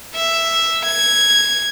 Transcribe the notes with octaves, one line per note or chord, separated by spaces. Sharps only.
E5
G#6